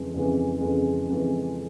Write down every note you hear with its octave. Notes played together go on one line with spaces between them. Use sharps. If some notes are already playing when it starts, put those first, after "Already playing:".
Already playing: F2 C#3 E3 G#3
F2 C#3 E3 G#3
F2 C#3 E3 G#3
F2 C#3 E3 G#3